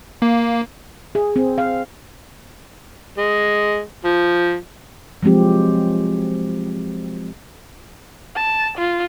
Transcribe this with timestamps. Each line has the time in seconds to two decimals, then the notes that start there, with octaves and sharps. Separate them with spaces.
0.22 A#3
1.15 G#4
1.36 C4
1.58 F5
3.18 G#3
4.05 F3
5.23 F3 F#3 G#3 C4 G4
8.36 A5
8.78 F4